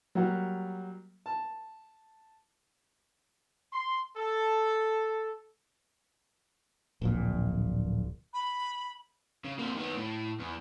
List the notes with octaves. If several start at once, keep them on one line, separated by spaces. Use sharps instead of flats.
F#3 G3 A#3 F#4
A5
C6
A4
D1 A#1 A#2
B5
C#3
C3 A#3
D#3 B3
A2
E2